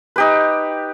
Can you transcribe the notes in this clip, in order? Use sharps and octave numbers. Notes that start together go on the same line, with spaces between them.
D#4 G4 B4